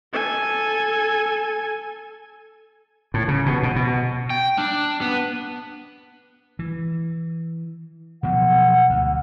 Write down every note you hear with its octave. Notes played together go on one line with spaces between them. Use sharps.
A4 G#5
A2
C#3
B2
B2
B2
G5
D4
B3
E3
B2 F3 F#3 F#5
D2